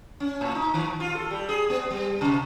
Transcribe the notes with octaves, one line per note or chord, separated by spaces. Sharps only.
C#4
A2
D#4
D#3
F4
A4
G3
G#4
B3
G3
C3